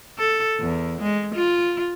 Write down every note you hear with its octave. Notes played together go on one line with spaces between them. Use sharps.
A4
E2
G#3
F4